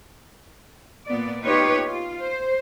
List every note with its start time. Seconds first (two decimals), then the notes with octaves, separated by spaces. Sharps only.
1.07 A#2 B3 D5
1.42 B3 D#4 F4 G4 B4 C#5
1.82 F4
2.22 C5